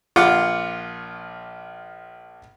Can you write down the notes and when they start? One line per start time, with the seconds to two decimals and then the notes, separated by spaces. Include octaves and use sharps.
0.16 A#1 F4 F#5 D6